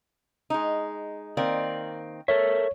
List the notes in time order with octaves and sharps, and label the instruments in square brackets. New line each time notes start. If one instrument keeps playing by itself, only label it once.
[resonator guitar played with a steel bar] G#3 D#4
[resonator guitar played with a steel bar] D#3 A#3 C4 [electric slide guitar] D5
[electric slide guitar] A4 A#4 E5 [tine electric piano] C#5